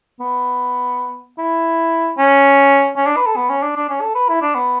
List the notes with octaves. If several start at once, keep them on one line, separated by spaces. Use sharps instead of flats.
B3
E4
C#4
C#4
D4
B4
A4
B3
C#4
D4
D4
C#4
A4
B4
E4
D4
B3